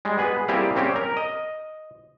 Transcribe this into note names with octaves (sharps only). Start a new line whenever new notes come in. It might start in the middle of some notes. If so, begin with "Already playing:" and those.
G3 G#3
B3 G#4 B4
G3 A#3 C4 E4 G4 G#4
G3 C4 C#4 G4
A#4
D#5